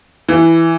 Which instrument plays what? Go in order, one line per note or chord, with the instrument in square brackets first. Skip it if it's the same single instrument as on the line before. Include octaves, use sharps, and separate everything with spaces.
[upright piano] E3